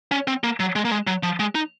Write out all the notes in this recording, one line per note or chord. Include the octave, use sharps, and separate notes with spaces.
C#4
C4
A#3
F#3
G#3
A#3
G#3
F#3
F3
G#3
D#4